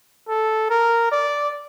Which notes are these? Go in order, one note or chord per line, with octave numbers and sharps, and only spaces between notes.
A4
A#4
D5